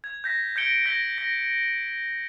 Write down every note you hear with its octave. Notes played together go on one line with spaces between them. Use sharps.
G#6
G6 A#6 B6
G6 G#6 A#6 C#7 D7 G7
G6 A#6 B6 F#7 G7
A#6